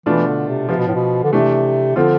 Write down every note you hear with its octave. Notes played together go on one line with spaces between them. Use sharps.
B2 E3 A3 D4 F4
D3
C3
C3 F3 B3 F4
B2
A2
B2
D3
C3 E3 A3 D4
D3 F3 C4 F4